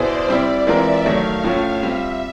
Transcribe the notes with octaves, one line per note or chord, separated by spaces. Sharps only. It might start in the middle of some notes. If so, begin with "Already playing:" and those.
Already playing: B2 B3 E4 G#4 C5 D5
G3 C4 E4
E3 G#3 C4 F4 A#4 E5
D#3 F#3 A3 F5
A2 F3 A3 C#4
G3 C4 F4 E5